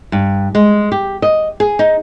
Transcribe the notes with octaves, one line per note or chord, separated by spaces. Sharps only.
G2
G#3
G4
D#5
G#4
D#4